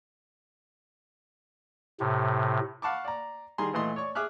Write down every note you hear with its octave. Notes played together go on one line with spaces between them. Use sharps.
A2 C3
F5 F#5 A5 B5 C#6 D6
D5 A#5
D#3 G3 G#4 A#5 C6
A#2 E3 A3 D#5 C6
C#5 D5 C#6
G#4 E5 D6 F6 F#6